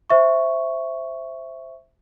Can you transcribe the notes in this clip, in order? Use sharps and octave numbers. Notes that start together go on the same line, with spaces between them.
C5 E5 C#6